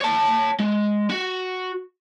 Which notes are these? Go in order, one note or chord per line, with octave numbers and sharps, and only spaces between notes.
C#5 A5
G#3
F#4